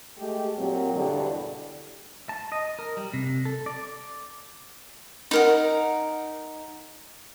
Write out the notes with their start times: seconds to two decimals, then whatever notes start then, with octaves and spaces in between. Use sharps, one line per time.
0.19 G#3 A3 G4
0.58 A#2 F#3 A#3 C4 G4
0.95 E2 G2 B2 D3
2.29 A5
2.52 D#5
2.79 A#4
2.97 G3
3.14 C3
3.45 A4
3.66 D5
5.31 D#4 A#4 F#5